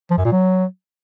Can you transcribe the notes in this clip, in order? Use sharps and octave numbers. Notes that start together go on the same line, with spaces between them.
F3
F#2
A#2
F#3